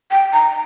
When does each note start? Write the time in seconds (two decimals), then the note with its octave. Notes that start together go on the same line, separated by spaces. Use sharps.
0.11 G5
0.33 A#5